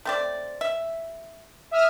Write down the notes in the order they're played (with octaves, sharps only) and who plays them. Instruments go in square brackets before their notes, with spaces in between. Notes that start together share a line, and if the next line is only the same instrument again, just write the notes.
[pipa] A3 C4 D5
E5
[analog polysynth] E5 D#6 F6